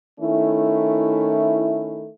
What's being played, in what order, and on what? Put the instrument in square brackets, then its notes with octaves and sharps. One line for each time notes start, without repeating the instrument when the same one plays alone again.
[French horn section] D#3 A3 C#4 E4